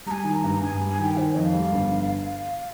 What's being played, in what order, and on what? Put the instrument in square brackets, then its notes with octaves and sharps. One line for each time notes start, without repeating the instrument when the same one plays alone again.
[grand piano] G3 [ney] A#5
[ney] G#5
[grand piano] D#3
[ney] A#5
[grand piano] G2
[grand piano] G2 [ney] G#5
[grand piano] G3
[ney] G#5
[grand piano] D#3 [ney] G5
[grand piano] D#3 [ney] C5
[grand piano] F2 [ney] D#5
[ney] F5
[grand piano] G3
G1